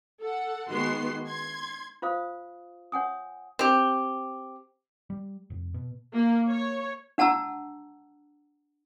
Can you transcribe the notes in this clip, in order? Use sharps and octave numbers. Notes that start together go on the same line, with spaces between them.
A4 F#5
D#3 G#3 B3 F#4 C6 C7
C6 G#6
F4 C5 F5 D#6
C#5 F#5 G#5 D#6
C4 G4
G3
F1
B2
A#3
C#5
D4 F#5 A5 A#5 E6